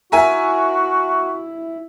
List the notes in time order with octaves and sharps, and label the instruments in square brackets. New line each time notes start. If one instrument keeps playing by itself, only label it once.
[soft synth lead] E4 [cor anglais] F#4 [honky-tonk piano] A#4 E5 G#5